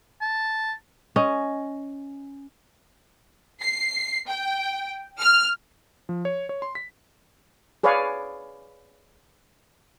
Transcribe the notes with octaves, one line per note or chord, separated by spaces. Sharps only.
A5
C#4 D#5
C7
G5
F6
F3
C#5
C#5
C6
B6
G#4 B4 C#5 D5 F5